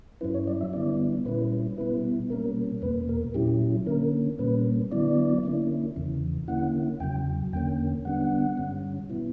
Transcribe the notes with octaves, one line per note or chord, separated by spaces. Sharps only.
G2 F#3 C#4 E4 B4
C#5
D5
E5
D3 G3 B3 E4 D5
A#2 G3 C#4 E4 B4
B2 G3 B3 E4 B4
B2 G3 A#3 C#4 A#4
E2 B2 A#3 B4
A#4
A#2 F#3 C#4 E4 G4
D3 A#3 C#4 A#4
A#2 G3 A#3 C#4 B4
D3 F#3 B3 E4 D5
D3 A#3 C#4 E4
E2 C#3 E3
D3 A#3 C#4 E4 F#5
E2 C#3 F#3 G5
E2 D3 A#3 C#4 G5
D3 G3 B3 D4 F#5
G2 D3 G3 C#4
B2 F#3 B3 E4